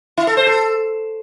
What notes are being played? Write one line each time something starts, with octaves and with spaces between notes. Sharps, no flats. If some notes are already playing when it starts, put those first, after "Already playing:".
E4
A4
C5
A4